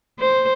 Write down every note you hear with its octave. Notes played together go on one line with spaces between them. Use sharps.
C5